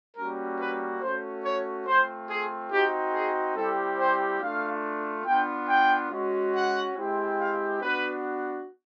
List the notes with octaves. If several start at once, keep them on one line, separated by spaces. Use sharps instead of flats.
G3 A#3 C#4 F#4 A#4
B4
A3 C#4 F#4 C5
C#5
A3 C4 F4 C5
G#4
C4 D#4 F#4 G4
G#4
G3 C4 E4 G4 A4
C5
A3 D4 F4 F5
B3 D4 F4 G5
G5
G#3 C#4 F#4
F#5
G#3 C4 E4 G4
F5
B3 D4 F#4 B4